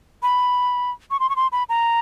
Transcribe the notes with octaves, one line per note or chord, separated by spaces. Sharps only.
B5
C#6
C6
C#6
C6
B5
A#5